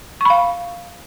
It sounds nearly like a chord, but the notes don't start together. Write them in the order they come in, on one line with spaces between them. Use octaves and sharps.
C#6 B5 F5